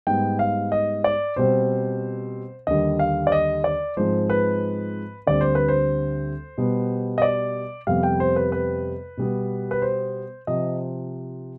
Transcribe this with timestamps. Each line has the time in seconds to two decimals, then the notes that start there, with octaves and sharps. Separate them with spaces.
0.07 G#2 G3 B3 G5
0.39 F5
0.72 D#5
1.04 D5
1.36 B2 G3 C4 C5
2.67 D#2 D3 G3 D#5
2.99 F5
3.27 D5
3.32 D#5
3.64 D5
3.97 G#2 F3 G#3 C4 C5
4.30 B4
5.27 D2 D3 G3 C4 D5
5.41 C5
5.55 B4
5.68 C5
6.58 B2 G3 B3
7.18 D#5
7.22 D5
7.87 F2 C3 G3 B3 F5
8.03 G5
8.20 C5
8.36 B4
8.52 B4
9.17 B2 G3 B3
9.71 B4
9.82 C5
10.47 C3 F3 D#5